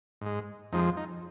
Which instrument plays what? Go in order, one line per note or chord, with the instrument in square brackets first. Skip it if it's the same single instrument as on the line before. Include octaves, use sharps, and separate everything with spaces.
[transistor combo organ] G#2 G#3
F2 F3 G#3 D#4
D#4